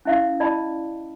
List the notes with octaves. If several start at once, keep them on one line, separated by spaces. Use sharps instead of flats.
C#4 E4 E5 F5
E4 D5 D#5 A5 B5